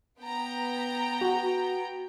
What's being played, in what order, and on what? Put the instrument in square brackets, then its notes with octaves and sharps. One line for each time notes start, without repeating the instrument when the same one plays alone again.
[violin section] B3 G5 A#5
[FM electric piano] F#4